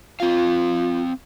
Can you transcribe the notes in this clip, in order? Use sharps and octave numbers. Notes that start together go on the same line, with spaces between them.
C4 F4 F5